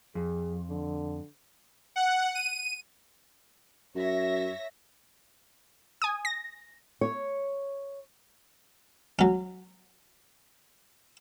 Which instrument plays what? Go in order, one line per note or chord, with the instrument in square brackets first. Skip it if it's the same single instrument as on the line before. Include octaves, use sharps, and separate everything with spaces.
[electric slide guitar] F2 [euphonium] G#4
[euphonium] D3
[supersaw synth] F#5
D#7
[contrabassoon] F#2 [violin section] C#5 E5 A#6
[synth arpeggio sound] G#5 D#6
A#6
[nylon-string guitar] C#5
[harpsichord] F#3 C#4